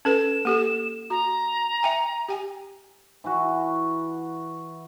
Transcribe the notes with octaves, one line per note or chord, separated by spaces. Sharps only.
C#4 A4 B4 E7
A#3 G4 A4
F#4 A#5
E5 G5 G#5
G4 G5 G#5
E3 E4 F#4